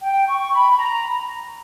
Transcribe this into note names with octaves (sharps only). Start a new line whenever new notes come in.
G5
C#6
B5
A#5